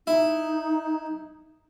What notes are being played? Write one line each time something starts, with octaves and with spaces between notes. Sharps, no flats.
D#4 E4